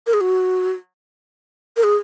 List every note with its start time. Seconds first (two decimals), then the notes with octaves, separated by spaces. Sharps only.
0.07 A#4
0.13 G#4
0.21 F#4
1.77 A#4
1.83 G#4